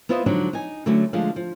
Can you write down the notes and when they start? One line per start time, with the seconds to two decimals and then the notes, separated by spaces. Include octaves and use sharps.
0.09 B3 E4 F4 C5 D#5
0.26 D3 F3 F#3 G#3 D4 D#4
0.53 D#4 G#5
0.86 D3 F#3 A3 C#4 E4 F#4
1.13 D3 F3 G#3 A3 G#4 F5
1.36 F3